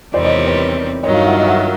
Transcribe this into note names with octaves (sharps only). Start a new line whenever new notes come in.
E2 C3 D#3 G3 C4 C5 D5
C#5 D#5
B4 C#5
G2 D#3 F#3 C#5 D#5
D#5 F5
E5 F#5
D#5 F5
E5 F#5